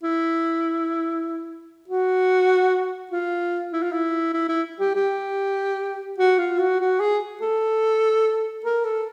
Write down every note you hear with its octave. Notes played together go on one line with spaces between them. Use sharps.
E4
F#4
F4
E4
F4
E4
E4
E4
G4
G4
F#4
F4
F#4
F#4
G#4
A4
A#4
A4